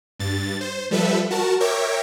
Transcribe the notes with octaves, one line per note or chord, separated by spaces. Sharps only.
G2 A6
C5
F3 G3 A4 B4 E5
F#4 A#4 A5
A#4 C#5 E5 G5 D6